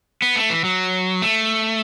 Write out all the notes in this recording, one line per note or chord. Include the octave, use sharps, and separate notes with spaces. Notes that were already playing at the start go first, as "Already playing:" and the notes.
B3
A3
E3
F#3
A3